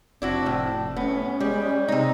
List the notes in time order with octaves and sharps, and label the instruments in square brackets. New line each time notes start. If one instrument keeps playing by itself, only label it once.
[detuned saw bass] F1 [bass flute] C4 [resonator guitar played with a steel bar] D4 E4 F#4
[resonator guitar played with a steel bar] A2
[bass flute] A3 [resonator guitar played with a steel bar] B3 [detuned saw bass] C#4
[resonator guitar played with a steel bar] G3 [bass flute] G#3
[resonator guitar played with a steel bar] C3 D#4 [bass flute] C4